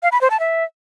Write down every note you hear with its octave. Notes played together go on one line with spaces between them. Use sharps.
F5
B5
C5
A5
E5